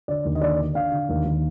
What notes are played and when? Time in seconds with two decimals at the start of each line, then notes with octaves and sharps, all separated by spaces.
0.08 D3 D5
0.25 D#2
0.35 D#5
0.42 D3 D5
0.59 D3
0.75 D3 F5
0.92 D3
1.09 D#2
1.25 D#2